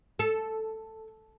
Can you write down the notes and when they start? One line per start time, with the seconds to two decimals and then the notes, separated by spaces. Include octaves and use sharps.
0.19 A4